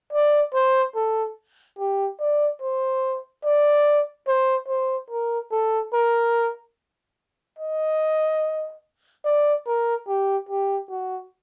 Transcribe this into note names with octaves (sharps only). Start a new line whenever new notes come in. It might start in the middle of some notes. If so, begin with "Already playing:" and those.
D5
C5
A4
G4
D5
C5
D5
C5
C5
A#4
A4
A#4
D#5
D5
A#4
G4
G4
F#4